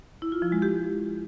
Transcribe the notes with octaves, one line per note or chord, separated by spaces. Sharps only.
E4
F4
F3
G#3
G4